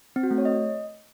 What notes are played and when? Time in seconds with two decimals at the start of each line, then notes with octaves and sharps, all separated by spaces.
0.16 C4
0.23 F#4
0.31 A3
0.38 C#5
0.45 D#5